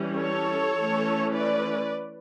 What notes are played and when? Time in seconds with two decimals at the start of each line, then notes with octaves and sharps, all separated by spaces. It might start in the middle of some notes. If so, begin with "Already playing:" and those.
Already playing: E3 G3 C#4
0.16 A4 C#5
0.76 E3 A3 C#4
1.36 B4 D5